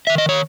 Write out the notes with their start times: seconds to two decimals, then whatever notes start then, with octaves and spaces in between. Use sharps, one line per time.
0.07 D#3 E5
0.18 D#5
0.29 C#5